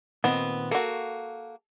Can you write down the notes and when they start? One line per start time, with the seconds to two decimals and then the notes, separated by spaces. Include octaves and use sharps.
0.24 A#2 D#3 B3 C4
0.71 A#3 F#4 A4